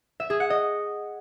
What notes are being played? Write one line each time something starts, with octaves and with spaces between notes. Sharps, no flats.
E5
G#4
F#5
D#5